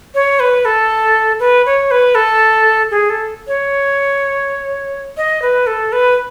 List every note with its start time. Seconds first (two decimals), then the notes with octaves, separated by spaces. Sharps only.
0.15 C#5
0.40 B4
0.65 A4
1.40 B4
1.66 C#5
1.91 B4
2.15 A4
2.91 G#4
3.10 A4
3.47 C#5
5.17 D#5
5.42 B4
5.67 A4
5.92 B4